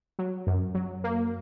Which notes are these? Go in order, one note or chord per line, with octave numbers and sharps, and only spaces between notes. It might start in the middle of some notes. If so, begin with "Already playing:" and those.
F#3
F#2
F#3
A#3